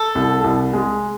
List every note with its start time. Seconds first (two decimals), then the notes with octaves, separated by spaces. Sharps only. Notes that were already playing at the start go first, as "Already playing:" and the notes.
Already playing: A4
0.15 C2
0.44 C2
0.73 G#3